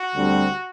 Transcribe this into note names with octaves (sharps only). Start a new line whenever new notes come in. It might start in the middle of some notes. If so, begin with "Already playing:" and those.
Already playing: F#4
D2 D3 G3 C4